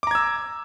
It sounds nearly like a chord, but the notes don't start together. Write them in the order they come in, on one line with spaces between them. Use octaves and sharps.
D6 A#5 G#6 E6